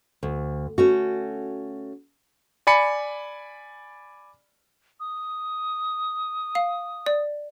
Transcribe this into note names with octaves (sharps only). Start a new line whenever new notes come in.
D2
A3 C#4 F#4
D5 G#5 B5 C#7
D#6
F5
D5